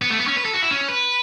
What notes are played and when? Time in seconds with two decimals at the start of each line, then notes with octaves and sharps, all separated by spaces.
0.02 B3
0.10 A3
0.19 B3
0.27 C#4
0.37 B4
0.45 A4
0.54 F#4
0.62 E4
0.71 C#4
0.88 B4